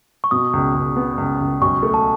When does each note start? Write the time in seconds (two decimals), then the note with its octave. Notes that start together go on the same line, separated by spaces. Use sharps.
0.24 C#6
0.31 B2 D#6
0.53 C#2
0.75 C#2
0.96 B3
1.18 C#2
1.40 C#2
1.61 B1 C#6
1.83 A3
1.94 A5